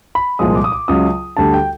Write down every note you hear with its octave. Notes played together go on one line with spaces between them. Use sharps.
B5
C2 A#2 F3 G#3 D#6
D6
D#6
D6
C#2 C#3 F#3 D#6
D2 D3 G3 A5
G5